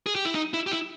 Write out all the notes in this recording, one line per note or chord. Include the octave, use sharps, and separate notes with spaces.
G#4
G4
E4
D#4
E4
G4
E4